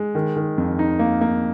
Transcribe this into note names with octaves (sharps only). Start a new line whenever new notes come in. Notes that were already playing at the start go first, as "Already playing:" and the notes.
Already playing: G#3
D#3
D#3
F2
D#4
A#3
A#3